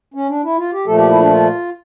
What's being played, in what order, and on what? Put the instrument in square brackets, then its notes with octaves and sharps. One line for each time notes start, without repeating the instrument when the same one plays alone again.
[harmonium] C#4
D4
E4
F4
G4
A#2 F3 A3 A4
G4
E4
D4
F4